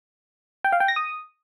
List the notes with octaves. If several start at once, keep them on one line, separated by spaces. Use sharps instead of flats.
G5
F5
G5
A#6
D#6